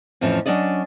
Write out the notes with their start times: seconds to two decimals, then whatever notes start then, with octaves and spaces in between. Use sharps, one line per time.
0.21 F2 A2 E3 F3 C#4
0.46 F#3 C#4 D4 D5 D#5